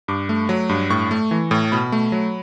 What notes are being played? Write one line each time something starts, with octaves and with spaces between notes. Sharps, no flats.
G2 D6
A3
F#3
G2
A2 C#6
A3
E3
A2
B2 B5
A3
F#3